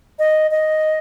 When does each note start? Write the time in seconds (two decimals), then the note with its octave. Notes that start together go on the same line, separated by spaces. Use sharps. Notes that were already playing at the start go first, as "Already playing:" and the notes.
0.19 D#5
0.51 D#5